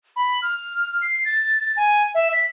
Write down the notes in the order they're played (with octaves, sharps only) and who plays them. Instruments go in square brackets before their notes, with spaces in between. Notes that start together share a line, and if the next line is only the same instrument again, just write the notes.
[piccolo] B5
F6
C7
A6
G#5
E5
B6